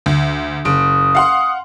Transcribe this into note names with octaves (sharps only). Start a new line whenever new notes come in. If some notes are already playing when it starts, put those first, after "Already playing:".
D2
F#1 D#6 D7
F5 F#5 C6